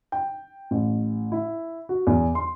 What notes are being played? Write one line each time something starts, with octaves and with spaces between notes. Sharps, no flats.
G5
A1
E4
F#4
E2
C6